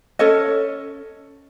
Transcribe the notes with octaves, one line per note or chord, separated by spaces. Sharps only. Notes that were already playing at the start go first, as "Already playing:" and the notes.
C#4 A4 C#5 D#5